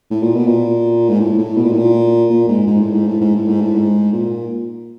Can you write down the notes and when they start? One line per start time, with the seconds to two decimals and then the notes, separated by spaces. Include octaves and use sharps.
0.11 A2
0.22 A#2
0.34 B2
0.47 A#2
1.09 G#2
1.20 A2
1.38 A2
1.57 B2
1.64 A#2
1.72 A2
1.78 A#2
2.30 A#2
2.48 G#2
2.67 G#2
2.80 A2
2.93 G#2
3.07 A2
3.21 G#2
3.35 A2
3.48 G#2
3.62 A2
3.75 G#2
4.12 A#2